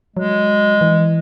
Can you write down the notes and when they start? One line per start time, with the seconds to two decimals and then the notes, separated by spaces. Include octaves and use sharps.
0.16 F#3 G#3
0.81 E3